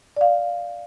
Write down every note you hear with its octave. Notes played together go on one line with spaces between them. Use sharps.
D5 F5